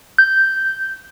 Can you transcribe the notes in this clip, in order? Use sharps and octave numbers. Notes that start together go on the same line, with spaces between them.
G6